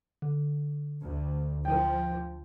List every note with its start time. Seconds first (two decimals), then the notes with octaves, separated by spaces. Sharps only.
0.22 D3
1.02 D2
1.65 F3 G5